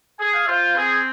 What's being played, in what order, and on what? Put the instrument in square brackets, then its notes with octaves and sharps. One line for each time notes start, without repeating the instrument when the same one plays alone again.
[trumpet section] G#4 [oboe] G#5
[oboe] F5
[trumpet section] F4 [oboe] C5
[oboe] C4 [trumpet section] G#4